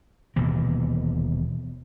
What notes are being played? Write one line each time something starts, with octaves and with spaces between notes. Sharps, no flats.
D#1 B2 E3 A#3